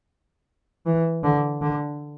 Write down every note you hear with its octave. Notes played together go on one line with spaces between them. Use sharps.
E3
D3
D3